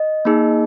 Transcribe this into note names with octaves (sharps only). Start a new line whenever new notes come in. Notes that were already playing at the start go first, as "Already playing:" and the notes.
Already playing: D#5
A#3 D#4 G#4